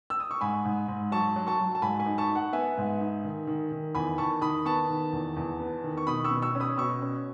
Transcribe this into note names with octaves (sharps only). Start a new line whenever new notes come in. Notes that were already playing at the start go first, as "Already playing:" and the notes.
E6
D#6
C#6
G#2 G#5 B5
G#2
G#2
F#3 A5 C#6
F#3
A5 C#6
F#3
A5
G#2 G#5 B5
G#5 B5
D#4
A5 C#6
D#4
F#5
B3 E5 G#5
G#2
D#4
D#3
D#3
D#3
E2 G#5 B5
D#3 A5 C#6
D#3 B5 D#6
B3 A5 C#6
D#3
E2
E2
B3
D#3
C#6
B2 B5 D#6
C#6 E6
B2
C#6 E6
C#4
B5 D#6
B2 C#6 E6
C#4